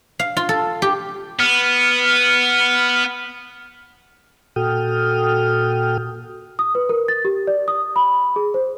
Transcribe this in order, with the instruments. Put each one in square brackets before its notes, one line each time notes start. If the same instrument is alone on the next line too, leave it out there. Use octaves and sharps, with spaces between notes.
[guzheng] F5
F4
A4
G4
[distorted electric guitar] B3 [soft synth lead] F6
[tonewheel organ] A#2 F#4 A4 G5 D#6 F6
[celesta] D#6
B4
A#4
A6
G4
D5
D#6
B5
G#4
C5